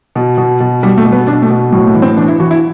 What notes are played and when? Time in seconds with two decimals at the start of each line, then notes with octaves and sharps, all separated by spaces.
0.15 B2
0.38 B2
0.60 B2
0.83 B2 G3
0.97 A3
1.05 B2
1.13 B3
1.27 B2 D4
1.42 A3
1.50 B2
1.72 A2 F#3
1.87 A3
1.95 E3
2.02 C4
2.17 E3 D4
2.28 E4
2.40 E3 F#4
2.51 E4